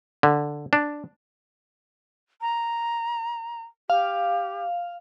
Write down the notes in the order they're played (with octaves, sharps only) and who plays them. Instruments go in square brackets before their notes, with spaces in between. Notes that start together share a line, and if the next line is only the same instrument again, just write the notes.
[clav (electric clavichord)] D3
D4
[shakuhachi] A#5
[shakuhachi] G4 [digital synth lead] F5